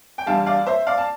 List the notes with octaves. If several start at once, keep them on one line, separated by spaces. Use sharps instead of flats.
G5
E2 D3 G3 F5 A5
D5 F5
C5 E5
D5 F5
A5